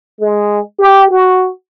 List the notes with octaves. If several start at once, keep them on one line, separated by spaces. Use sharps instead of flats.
G#3
G4
F#4